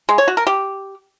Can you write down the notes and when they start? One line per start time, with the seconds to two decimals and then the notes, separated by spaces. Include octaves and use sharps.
0.09 G#3
0.18 C#5
0.28 F#4
0.37 A#4
0.47 G4